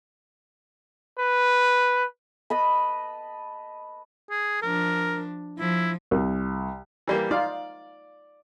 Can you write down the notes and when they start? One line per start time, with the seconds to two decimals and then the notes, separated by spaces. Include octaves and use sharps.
1.19 B4
2.50 B4 D#5 A5 B5
4.30 G#4
4.62 F3 D4 A#4
5.59 F3 E4
6.11 C2
7.07 E3 G3 A#3
7.31 D#4 F4 D5 F5